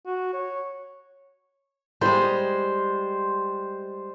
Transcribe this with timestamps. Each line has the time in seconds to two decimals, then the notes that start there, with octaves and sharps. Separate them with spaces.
0.06 F#4
0.33 C#5
2.01 G3 G#3 C5